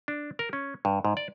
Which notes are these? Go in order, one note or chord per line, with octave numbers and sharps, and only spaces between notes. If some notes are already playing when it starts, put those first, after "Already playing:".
D4
A#4
C#4
G2
G#2
D5